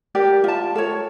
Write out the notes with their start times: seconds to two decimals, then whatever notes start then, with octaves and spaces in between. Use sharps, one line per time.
0.15 G4 A#4 D5
0.44 F4 A5
0.75 A4 A#4 C#5